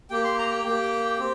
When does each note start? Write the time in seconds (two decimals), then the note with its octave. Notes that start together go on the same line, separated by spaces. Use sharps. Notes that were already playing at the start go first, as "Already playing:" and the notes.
0.10 A#3 G4 G5
0.24 C6
0.38 A#5
0.51 G5
0.64 A#3 G4
1.19 C4 G4